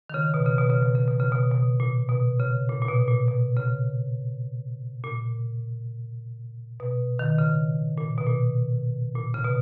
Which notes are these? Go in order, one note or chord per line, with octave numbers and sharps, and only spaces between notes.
D#3
C#3
B2
C#3
B2
C#3
B2
C#3
B2
C#3
B2
B2
A#2
B2
C#3
A#2
A#2
B2
A#2
B2
C#3
A#2
B2
D#3
C#3
A#2
B2
A#2
A#2
C#3
B2